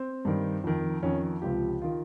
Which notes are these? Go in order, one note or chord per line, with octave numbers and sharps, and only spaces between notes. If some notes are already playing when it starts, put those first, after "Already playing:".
Already playing: C4
G2 D#3
F2 D#3
F2 D#3 C#4
C#2 C3 F3 G4
D#3 F4